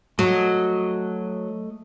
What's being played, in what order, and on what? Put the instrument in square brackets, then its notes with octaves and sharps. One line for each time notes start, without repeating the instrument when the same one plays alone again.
[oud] F#3 [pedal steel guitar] A3 D#5